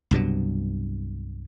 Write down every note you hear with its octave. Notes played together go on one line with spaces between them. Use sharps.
C2 G2 B2 F#3